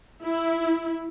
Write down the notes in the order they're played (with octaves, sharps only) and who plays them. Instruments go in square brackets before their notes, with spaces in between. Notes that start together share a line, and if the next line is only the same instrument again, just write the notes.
[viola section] E4